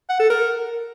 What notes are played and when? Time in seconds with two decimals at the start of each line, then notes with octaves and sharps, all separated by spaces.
0.10 F#5
0.20 A4
0.30 A#4